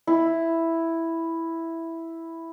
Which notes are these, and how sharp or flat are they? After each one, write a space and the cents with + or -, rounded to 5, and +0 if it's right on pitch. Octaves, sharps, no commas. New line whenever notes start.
E4 +0